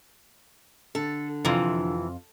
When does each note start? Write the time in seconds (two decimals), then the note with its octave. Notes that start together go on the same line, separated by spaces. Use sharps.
0.95 D3 A4
1.45 F2 C3 E3 F4